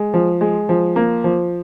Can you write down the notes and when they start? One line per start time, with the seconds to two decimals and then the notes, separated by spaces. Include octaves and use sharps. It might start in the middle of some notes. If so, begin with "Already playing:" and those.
Already playing: G#3
0.14 F3
0.41 G#3
0.69 F3
0.96 A#3
1.24 F3